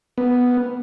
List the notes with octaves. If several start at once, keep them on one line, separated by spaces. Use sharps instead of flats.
B3